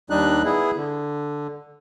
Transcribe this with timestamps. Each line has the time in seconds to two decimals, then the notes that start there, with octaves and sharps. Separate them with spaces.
0.10 D#2 G3 D4 D#4 F#6
0.45 B3 E4 G#4
0.77 D3